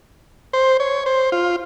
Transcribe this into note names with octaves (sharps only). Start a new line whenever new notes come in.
C5
C#5
C5
F4